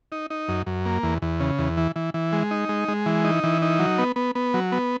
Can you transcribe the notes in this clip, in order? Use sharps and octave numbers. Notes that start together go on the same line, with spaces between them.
D#4
D#4
F#2
F#2
A#3
E2
E2
C#3
E2
E3
E3
E3
G#3
D#4
G#3
G#3
E3
D#4
E3
D#4
F#3
B3
B3
B3
F#3
B3